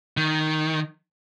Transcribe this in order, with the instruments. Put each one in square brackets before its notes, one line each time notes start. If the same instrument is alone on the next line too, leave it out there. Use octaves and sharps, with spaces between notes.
[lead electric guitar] D#3